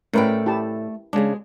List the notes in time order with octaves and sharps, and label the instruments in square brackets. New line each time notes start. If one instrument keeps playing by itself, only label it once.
[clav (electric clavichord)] A2 [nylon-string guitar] A3 D5 G5 [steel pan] C#4 A#4 B4
[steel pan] E4 G4 A5
[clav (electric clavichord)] C#3 D4 [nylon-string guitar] G#3 G#4